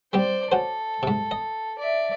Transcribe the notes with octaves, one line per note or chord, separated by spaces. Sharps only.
G3 C4 G4 C5 D5
C#4 F#4 A4 C5
G#2 C3
D#5
D5 E5